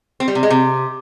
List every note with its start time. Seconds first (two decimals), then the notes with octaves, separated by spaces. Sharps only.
0.20 C4
0.28 G3
0.35 C3
0.43 G#3
0.50 C3